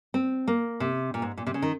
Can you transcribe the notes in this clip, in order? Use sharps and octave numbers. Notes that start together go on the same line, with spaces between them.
C4
A#3
C3
A#2
G#2
A#2
C3
C#3
D#3